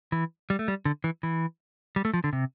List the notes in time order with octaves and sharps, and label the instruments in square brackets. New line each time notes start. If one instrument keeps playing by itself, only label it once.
[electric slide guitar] E3
G3
A3
G3
D3
E3
E3
G3
A3
F3
D3
C3